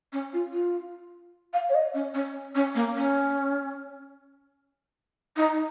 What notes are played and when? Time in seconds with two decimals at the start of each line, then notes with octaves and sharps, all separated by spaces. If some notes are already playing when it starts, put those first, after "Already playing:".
0.12 C#4
0.33 F4
0.52 F4
1.53 F5
1.69 C#5
1.74 D#5
1.94 C#4
2.14 C#4
2.55 C#4
2.75 A#3
2.95 C#4
5.36 D#4